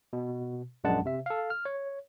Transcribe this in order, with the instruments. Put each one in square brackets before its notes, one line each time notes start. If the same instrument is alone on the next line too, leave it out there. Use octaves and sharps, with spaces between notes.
[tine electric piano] B2
A#1 F#2 G#3 D4 F#5 A5
C3 E5
A4 F5
F6
C#5